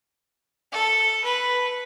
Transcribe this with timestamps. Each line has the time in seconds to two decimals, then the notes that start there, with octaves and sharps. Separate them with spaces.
0.72 A4
1.24 B4